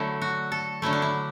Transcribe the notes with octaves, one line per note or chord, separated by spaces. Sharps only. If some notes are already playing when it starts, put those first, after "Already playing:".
Already playing: D3 F#3 A3 E4
F#4
A4
D3 F#3 A3 E4
D4
E4